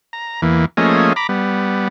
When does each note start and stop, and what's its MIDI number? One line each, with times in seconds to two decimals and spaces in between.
0.13 0.41 82
0.42 0.65 40
0.42 0.65 52
0.42 0.65 58
0.77 1.13 53
0.77 1.13 57
0.77 1.13 58
0.77 1.13 61
0.77 1.13 68
0.77 1.13 75
1.16 1.27 82
1.16 1.27 83
1.16 1.27 86
1.29 1.88 55
1.29 1.88 59